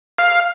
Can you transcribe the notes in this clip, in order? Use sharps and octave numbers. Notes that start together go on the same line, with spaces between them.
F5